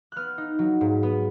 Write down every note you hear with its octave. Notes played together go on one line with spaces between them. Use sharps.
B3 F6 F#6
D#4
F#3
G#2
B3